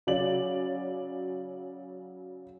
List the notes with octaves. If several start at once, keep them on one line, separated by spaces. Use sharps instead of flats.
C#3 F#3 D5 F#7